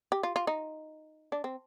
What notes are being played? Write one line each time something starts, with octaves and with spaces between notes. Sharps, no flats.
G4
F4
F4
D#4
D4
C4